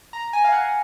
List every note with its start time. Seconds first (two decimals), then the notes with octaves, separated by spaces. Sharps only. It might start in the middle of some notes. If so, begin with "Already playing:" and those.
0.13 A#5
0.33 G#5
0.44 F5
0.53 F#5